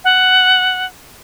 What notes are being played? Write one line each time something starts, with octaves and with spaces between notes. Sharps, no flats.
F#5